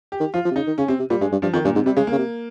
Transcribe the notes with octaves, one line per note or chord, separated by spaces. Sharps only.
G4
D#3
F3 F4
F3
C3
C#3 D#4
D#3
C#3 C#4
C3 C4
C3
A#2 G3
G2 G#3
G2
G2 F3
F2 D#3
G2 A#2
G#2 C3
C3 G3
C#3 G#3
C#3 A#3
C3